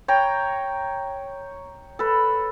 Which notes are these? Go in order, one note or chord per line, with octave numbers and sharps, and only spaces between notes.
C#5 G5 A#5
A4 B4